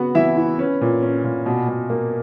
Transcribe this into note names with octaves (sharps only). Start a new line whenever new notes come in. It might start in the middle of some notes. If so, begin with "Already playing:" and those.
Already playing: C#3 B3 F#4 F#5
E3 E4 E5
E4
C#4 B4
A#2
C#4
A#2
B2
B2
A#3